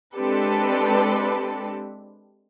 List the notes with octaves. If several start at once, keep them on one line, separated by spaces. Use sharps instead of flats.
G#3 C4 D4 G4 A4 B4